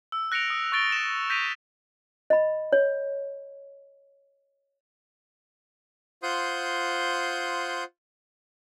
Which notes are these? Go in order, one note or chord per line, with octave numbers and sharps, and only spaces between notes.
E6
F#6 A#6 C#7 D7 F7
D#6
C#6 F#6 A6 D7 G7
A#6 E7
G6 A#6 B6 D7 D#7 F7
D#5 B5
C#5
F4 C5 F#5 C6 D#6 G6